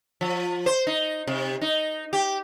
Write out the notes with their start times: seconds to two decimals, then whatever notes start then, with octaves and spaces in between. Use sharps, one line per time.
0.21 F3
0.66 C5
0.87 D#4
1.27 C3
1.61 D#4
2.13 G4